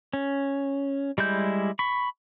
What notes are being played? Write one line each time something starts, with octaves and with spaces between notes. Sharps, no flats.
C#4
G3 G#3 E4 G6
B5 C#6